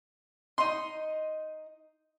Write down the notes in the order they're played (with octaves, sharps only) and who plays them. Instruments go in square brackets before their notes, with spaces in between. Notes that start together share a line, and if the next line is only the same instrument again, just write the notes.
[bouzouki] D#4 D#5 [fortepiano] C6